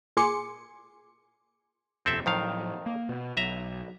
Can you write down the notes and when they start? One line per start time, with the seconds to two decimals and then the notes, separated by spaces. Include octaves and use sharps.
0.17 A#2 G#4 G#5 C6 D6 C#7
2.06 D#1 F2 C3 C4 A4 E5
2.26 F2 A2 D#3 F3 F#3 F5
2.86 A#3
3.09 B2
3.37 B1 F#3 D#5 E5 A#5